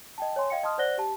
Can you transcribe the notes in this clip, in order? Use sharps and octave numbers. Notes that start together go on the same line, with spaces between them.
D#5 G5 A5
C#5 G#5 C6
D#5 F5 G5 C#7
D#5 A5 C6 D#6 F6
C5 D5 F#5 F#6 A#6 G7
G4 A5